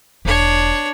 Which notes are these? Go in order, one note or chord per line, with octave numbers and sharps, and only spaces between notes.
E1 D4 C#5